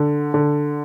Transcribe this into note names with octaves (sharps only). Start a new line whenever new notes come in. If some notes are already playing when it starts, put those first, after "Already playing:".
Already playing: D3
D3